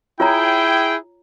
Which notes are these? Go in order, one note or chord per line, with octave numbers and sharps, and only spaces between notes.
E4 F4 G#4 C#5 G5 A#5